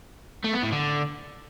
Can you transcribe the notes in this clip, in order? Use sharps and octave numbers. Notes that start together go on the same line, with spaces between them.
A3
B3
A2
D3